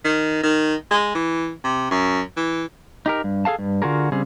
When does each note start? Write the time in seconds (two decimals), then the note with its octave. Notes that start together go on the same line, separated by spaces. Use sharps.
0.04 D#3
0.43 D#3
0.91 G#3
1.15 E3
1.64 C3
1.91 F#2
2.37 E3
3.06 D#4 G4 A#4
3.24 G2
3.45 G#4 A4 F5 A5
3.59 G2
3.82 D3 F4 F#4 G#4 A#4
4.12 C#3 G3 C4 G#4